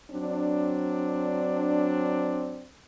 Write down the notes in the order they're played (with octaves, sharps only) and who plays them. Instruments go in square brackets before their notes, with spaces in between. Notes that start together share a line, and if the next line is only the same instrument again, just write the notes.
[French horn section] F#3 C4 D4